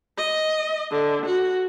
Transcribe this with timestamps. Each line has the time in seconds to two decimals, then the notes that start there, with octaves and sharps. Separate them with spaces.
0.18 D#5
0.91 D3
1.26 F#4